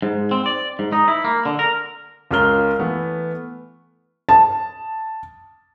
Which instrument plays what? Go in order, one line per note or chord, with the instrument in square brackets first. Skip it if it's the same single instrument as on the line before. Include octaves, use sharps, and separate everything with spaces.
[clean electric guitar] G#2
C4
D5
G#2
D#4
E4
A#3
D3
A#4
[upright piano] C#2 C#4 F4 A#4 F6 G7
E3 A3 B3
[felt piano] A5